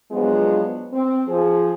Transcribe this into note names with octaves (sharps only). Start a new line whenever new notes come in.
F3 F#3 G#3 B3 D4 F4
C4
F3 G#4